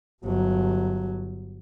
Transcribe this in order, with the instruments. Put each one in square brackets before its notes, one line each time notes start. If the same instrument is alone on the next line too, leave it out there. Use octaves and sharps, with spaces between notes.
[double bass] G1 F#3